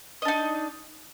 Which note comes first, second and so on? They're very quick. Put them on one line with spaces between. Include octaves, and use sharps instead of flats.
D#5 D4 D#4